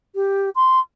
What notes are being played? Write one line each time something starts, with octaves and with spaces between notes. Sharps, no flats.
G4
C6